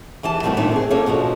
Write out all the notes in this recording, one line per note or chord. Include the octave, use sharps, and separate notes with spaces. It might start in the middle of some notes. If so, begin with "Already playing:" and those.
E2 E3 G4 A5
D#3 F#3 G3 A3 C4 E4
F2 A#2 D#3 D4 D#4
C4 G#4
F3 A#3 C#4 A4 A#4 C#5
B2 F3 D4 F#4